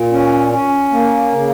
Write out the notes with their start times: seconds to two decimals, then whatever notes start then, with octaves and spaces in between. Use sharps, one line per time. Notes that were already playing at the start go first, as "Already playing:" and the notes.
Already playing: A#2
0.12 C#4
0.52 C#4
0.92 A#3
1.33 C#3